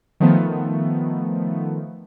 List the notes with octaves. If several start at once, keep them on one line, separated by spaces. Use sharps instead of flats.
D#3 F3 A3 B3